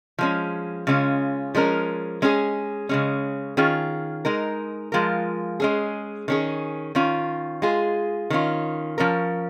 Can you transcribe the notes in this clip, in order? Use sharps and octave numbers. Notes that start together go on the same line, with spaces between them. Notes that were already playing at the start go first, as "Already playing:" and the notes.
F3 G#3 C#4
C#3 G#3 C#4 F4
F3 G#3 C#4 A#4
G#3 C#4 G#4
C#3 G#3 C#4
D#3 C#4 F4 G#4
G#3 D#4 A#4
F3 G#3 F4 A#4
G#3 C#4 G#4
D#3 C#4 G#4
D#3 C#4 F4
G#3 F4 G#4
D#3 C#4 F4
F3 C#4 A#4